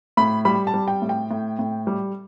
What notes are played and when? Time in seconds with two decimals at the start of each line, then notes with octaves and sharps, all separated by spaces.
0.17 A2 B5
0.45 G3 B5
0.67 A5
0.74 G3
0.88 G5
1.02 A2
1.09 G5
1.31 A2
1.59 A2
1.87 G3